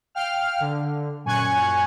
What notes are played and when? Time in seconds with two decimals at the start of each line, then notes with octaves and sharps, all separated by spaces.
0.15 F5 G5 F6
0.60 D3
1.24 F#2 A#2 G#5 C#6 F#6 G#6